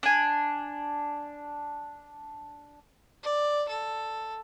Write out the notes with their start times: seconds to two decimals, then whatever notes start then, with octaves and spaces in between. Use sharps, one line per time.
0.03 D4 G#5
3.23 D5
3.69 A4